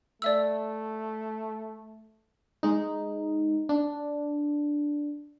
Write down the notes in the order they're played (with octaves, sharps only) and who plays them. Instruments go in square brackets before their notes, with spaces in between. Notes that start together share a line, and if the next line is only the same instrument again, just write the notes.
[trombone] A3 [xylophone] D5 E5 E6
[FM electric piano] G#3 D#4
D4